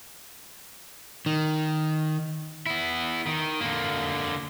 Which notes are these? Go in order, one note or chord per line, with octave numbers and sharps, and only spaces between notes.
D#3
B3 E4
D#3
D3 A#3